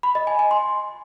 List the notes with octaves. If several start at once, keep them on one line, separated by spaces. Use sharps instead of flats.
B5
D#5
G#5
G#5
C6